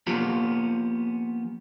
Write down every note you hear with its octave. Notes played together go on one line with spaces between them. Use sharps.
F3 A#3 B3 C#4 F4 G4